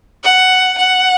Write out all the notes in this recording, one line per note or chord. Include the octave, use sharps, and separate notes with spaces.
F#5
F#5